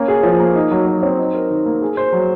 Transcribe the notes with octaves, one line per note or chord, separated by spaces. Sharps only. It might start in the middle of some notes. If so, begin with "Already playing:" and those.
Already playing: A#3 C#4
G#4
F3
A#3
D#4
F#3
F#3
C4
D#4
A#4
D#3
A#3
G#4
C5
F#3